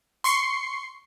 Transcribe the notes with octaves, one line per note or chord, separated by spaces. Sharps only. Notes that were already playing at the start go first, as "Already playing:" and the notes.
C6 C#6 C7 C#7